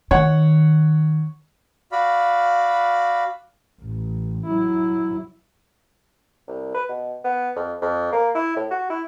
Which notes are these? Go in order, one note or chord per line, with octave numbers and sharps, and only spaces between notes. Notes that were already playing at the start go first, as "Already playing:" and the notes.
D#3 C#5 F#5
F#4 D5 F5 B5
A1
F#3 E4
C2
B4
B2
B3
F2
F2
A#3
E4
A2
F#4
E4